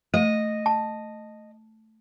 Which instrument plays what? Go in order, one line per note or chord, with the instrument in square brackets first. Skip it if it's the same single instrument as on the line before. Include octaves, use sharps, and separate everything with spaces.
[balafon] A3 F5 [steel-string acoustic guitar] D#5
[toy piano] A5